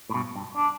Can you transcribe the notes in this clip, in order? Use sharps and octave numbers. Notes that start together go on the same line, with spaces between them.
A2
G2 B2
G2
D4